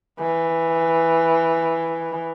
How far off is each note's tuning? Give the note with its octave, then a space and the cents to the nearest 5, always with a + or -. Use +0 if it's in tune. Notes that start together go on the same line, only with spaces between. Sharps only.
E3 +0